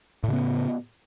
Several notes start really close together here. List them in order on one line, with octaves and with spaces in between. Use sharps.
A2 C#3 B3